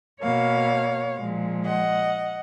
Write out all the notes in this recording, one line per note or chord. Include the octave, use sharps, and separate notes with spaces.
B2 A#3 C#5 F5
A#2 F3 G#3
D#5 F#5